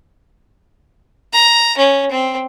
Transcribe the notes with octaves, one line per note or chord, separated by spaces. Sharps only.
A#5
C#4
C4